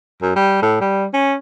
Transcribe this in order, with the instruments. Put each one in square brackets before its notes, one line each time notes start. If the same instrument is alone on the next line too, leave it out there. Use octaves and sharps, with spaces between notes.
[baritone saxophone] F#2
G3
A2
G3
C#4